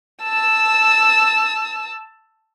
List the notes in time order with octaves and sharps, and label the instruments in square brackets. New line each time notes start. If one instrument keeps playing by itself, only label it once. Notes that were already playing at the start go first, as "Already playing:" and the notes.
[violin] A5 E6